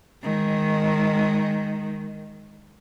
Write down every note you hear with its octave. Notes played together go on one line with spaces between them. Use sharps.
D#3 G#3